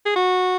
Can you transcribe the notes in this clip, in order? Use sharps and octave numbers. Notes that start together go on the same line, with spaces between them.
G#4
F#4